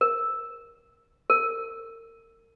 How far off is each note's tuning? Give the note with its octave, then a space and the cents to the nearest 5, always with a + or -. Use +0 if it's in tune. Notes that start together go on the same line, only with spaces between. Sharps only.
A#4 +10
A#4 -35